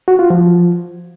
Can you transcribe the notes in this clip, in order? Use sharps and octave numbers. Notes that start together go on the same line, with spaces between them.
F#4
F4
F3